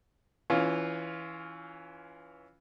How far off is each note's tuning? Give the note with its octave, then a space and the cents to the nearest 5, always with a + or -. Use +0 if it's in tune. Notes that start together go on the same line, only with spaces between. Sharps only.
E3 +0 C#4 +20 F4 +0